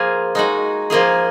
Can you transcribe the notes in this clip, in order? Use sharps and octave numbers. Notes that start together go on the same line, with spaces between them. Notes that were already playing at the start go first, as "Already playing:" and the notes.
Already playing: F3 A#3 F4 G#4
G#3 D#4 F#4
F3 A#3 F4 G#4